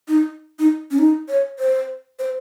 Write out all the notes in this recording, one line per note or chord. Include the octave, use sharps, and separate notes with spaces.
D#4
D#4
C#4
D#4
C#5
C5
C5